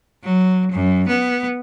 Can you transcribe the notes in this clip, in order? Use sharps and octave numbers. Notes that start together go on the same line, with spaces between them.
F#3
F#2
B3